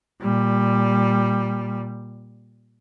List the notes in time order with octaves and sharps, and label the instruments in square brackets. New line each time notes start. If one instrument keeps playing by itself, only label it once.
[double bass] A#2 G3